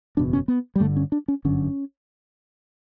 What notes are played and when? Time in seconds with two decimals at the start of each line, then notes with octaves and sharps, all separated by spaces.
0.17 F#1 E2 B2 D4
0.33 C#4
0.48 B3
0.76 G3
0.80 G1 G2 D3 A3
0.96 C#4
1.12 D4
1.28 C#4
1.45 G1 F#2 D3 C#4